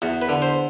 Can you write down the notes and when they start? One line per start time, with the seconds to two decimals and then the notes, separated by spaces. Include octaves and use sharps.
0.02 E2 F#4
0.22 B4
0.29 D3
0.42 C5